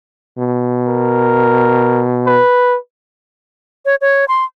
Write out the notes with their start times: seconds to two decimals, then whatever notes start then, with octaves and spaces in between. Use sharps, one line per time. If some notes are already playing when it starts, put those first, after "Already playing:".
0.38 B2
0.89 A#4
2.27 B4
3.85 C#5
4.01 C#5
4.28 C6